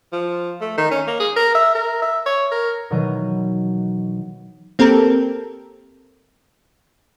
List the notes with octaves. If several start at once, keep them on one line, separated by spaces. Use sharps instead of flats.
F3
A3
D#3
C#4
A#3
G#4
A#4
E5
A#4
E5
C#5
A#4
B2 D#3 E3 F#3 G6 D#7
A#3 C4 G4 A4 A#4